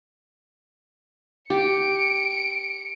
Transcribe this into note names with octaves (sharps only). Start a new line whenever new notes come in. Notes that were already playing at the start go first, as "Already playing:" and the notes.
G4 C#7 D7